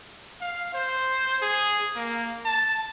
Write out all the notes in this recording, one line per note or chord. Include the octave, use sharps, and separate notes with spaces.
F5
C5
G#4
A#3
A5